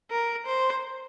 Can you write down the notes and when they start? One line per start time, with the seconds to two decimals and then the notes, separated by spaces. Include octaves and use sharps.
0.11 A#4
0.47 C5